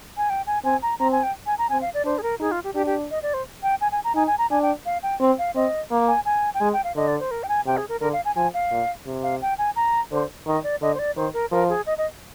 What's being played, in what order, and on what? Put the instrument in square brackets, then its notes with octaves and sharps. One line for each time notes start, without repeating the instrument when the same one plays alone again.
[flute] G#5
G5
G#5
[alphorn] C4 [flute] G#5
[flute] A#5
[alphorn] C4 [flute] A#5
[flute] G#5
G5
G#5
A#5
[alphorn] C4 [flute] G#5
[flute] F5
D5
[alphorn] D4 [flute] C5
[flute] G#4
A#4
[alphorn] D#4 [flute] G#4
[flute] F4
G4
[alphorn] D4 [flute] G4
[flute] G4
D#5
D5
C5
G5
G#5
G#5
A#5
[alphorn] D#4 [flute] G#5
[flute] G#5
A#5
[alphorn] D4 [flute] G#5
[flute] G5
F5
G5
[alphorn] C4
[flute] F5
[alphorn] C4 [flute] D#5
[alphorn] A#3
[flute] G#5
G#5
G5
[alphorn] G#3 [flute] G#5
[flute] G5
F5
[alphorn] D3 [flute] D#5
[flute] D5
C5
A#4
G5
G#5
[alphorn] C3 [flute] G5
[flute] G#4
A#4
[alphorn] D3 [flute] A#4
[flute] F5
G#5
[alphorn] F3 [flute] G#5
[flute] F5
[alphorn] A#2
C3
[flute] F5
G5
G#5
A#5
[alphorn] D3 [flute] C5
[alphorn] D#3 [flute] D#5
[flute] D5
[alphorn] D3 [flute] D#5
[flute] C5
D5
[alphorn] D#3 [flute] C5
[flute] A#4
[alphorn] F3 [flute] A#4
[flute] G#4
D#5
D#5